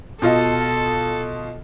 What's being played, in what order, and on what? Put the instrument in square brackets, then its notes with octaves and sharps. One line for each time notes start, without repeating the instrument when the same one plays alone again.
[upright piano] B2 F4 D#5 [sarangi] A4